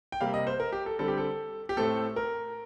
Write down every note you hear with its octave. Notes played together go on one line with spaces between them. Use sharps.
G5
C3 G3 A#3 F5
D#5
C5
A#4
G4
A4
D3 G3 C4 A4
G4
A4
G4
A2 A3 C4 A4
A#4